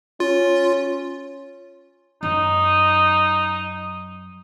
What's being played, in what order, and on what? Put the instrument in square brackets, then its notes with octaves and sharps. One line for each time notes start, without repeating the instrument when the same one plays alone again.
[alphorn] C#4 [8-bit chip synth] F4
[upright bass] F#2 [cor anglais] D#4